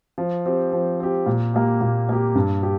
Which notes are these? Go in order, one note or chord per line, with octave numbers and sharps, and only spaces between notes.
F3
C4 G4
F3
C4 G4
A#2
A#3 G4
A#2
A#3 G4
G2
G4